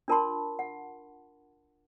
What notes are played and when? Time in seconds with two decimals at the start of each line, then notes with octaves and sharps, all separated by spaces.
0.08 D4 F4 A#4 A5 B5 C6
0.59 F#5